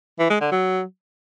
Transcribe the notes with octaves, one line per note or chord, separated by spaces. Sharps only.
E3
G#3
D3
F#3